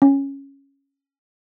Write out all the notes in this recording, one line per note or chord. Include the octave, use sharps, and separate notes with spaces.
C#4